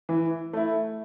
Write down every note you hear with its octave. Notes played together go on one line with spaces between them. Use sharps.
E3
A3 E4